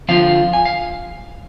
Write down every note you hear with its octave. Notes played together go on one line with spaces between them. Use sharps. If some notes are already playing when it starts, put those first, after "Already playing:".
D3 F3 C4 F4 F5
G#5
F5